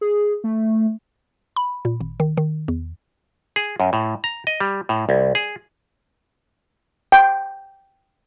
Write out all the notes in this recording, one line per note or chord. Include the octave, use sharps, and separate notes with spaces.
G#4
A3
B5
A#2
G#1
D#3
D#3
E2
G#4
F#2
A2
A#5
D#5
G3
A2
C2
G#4
G5